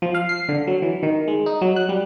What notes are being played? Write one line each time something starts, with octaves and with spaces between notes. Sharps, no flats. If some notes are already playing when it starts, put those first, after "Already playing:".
F3
F5
C7
D3
F#3
E3
D#3
G#3
D#4
F#3
F#6
G3